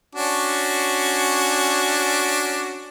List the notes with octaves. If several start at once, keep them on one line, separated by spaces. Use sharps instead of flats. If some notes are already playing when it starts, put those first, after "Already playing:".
C#4 D4 F#4